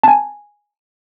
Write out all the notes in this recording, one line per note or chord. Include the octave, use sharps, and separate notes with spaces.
G#5 A5